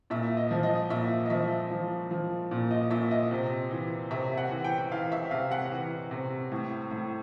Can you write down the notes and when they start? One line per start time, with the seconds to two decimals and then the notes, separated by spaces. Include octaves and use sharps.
0.10 A#2 E5
0.37 D#5
0.51 F3
0.63 D#5
0.90 A#2 E5
1.26 D#5
1.30 F3 E5
1.71 F3
2.11 F3
2.51 A#2
2.71 D#5
2.91 A#2 E5
3.11 D#5
3.31 C3
3.71 E3
4.11 C3 E5
4.38 F#5
4.51 E3
4.64 G5
4.91 E3 F5
5.12 E5
5.31 C3 F5
5.51 F#5
5.71 E3
6.11 C3
6.52 A2
6.91 A2